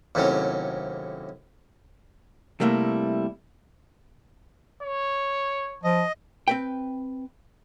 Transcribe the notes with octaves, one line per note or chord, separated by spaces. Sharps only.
D#2 A2 C3 F#3 C#4
C3 G3 A3 A#3 E4
C#5
F3 D#5
C4 B4 G5